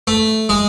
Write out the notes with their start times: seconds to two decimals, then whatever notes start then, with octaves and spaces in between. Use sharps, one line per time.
0.07 A3
0.49 G#3